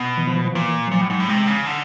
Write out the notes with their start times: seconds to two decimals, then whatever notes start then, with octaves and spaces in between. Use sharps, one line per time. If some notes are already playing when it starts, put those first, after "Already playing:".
Already playing: B2
0.17 E3
0.27 F3
0.35 E3
0.45 F3
0.54 A#2 E3
0.88 F#3
0.92 A#2 F3
1.01 A2
1.10 G#2 F#3
1.20 A2
1.28 C3 G#3
1.47 C#3
1.67 D3